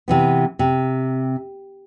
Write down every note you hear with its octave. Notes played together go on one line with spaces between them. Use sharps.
C3 E3 B3
C3